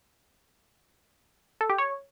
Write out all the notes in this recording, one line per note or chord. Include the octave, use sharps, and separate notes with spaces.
A4
G4
C#5